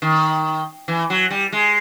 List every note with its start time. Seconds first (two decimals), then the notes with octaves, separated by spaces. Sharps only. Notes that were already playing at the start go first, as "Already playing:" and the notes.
0.02 D#3
0.88 E3
1.10 F#3
1.31 G3
1.52 G#3